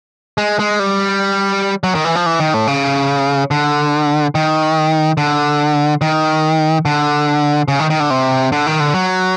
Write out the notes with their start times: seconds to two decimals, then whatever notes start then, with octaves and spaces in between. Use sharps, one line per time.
0.38 G#3
0.59 G#3
0.79 G3
1.84 F#3
1.95 D#3
2.05 E3
2.15 F3
2.26 E3
2.40 D#3
2.54 A2
2.67 C#3
3.51 D3
4.35 D#3
5.17 D3
6.01 D#3
6.85 D3
7.68 C#3
7.79 D#3
7.90 D#3
8.00 D3
8.10 C3
8.52 D3
8.67 D#3
8.80 D3
8.94 F#3